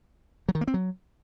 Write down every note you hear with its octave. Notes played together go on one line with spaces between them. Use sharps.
F#3
D#3
A#3
C4
F#3